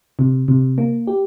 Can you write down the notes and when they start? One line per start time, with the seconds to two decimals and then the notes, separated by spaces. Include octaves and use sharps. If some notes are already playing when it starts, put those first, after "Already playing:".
0.19 C3
0.48 C3
0.78 A#3
1.07 G4